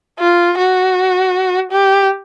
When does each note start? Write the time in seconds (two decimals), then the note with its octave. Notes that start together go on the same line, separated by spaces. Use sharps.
0.19 F4
0.58 F#4
1.72 G4